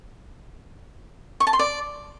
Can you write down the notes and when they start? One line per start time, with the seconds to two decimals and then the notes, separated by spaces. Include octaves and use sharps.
1.40 C#6
1.47 A5
1.53 C6
1.59 D5